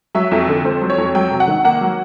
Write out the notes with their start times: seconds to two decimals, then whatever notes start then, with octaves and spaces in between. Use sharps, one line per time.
0.15 F#3 E5
0.32 F2
0.49 D3
0.65 F2 C5
0.81 F#3
0.90 C#5
0.98 F2
1.15 F#3 G5
1.31 C3
1.40 F#5
1.48 D#3
1.64 A#3 F#5
1.81 F#3